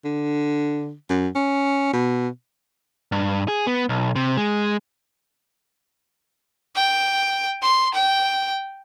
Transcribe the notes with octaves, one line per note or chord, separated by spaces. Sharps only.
D3
F#2
C#4
B2
G2
G#4
B3
B1
C3
G#3
G5
C6
G5